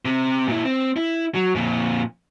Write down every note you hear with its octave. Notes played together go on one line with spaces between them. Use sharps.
C3
A#2 E4
C4
E4
F#3
F2 A#2